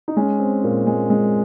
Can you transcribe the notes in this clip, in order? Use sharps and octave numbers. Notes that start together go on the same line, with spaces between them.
D#4
G#3 C#4
C4
A#2
G#3
G#3